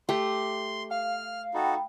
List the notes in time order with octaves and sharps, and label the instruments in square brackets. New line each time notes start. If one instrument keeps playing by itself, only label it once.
[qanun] A3 G4 [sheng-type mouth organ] C6
[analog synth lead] F5 [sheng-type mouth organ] F6
[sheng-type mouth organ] D#4 F#4 A4 [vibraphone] G5 B5